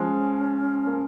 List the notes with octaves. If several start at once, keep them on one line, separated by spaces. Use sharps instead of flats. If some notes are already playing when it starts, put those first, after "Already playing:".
Already playing: F3 G#3 C#4
A#3